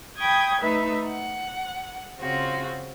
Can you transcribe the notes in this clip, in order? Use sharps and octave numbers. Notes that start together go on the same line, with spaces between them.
G5 B5 C#6 D#6 G6 G#6
A3 D#4 B4 E5
F#5
C#3 C4 F4 F#4